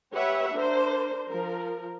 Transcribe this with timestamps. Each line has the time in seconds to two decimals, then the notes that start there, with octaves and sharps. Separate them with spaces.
0.13 G4 B4 C#5 E5 F#5
0.53 D4 A#4 C5
1.26 F3 A#4